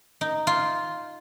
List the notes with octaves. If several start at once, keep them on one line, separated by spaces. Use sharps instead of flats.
D#4
F4